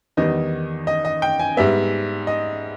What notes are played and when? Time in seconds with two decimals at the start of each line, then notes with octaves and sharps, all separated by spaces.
0.17 E2 D#3 G3 B3 D#5
0.87 D#5
1.05 D#5
1.22 G5
1.40 G#5
1.57 G#2 G3 B3 E5
2.27 D#5